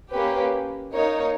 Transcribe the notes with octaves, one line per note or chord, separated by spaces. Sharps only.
A#3 C#4 G4 B4
A#3 D#4 A#4 C#5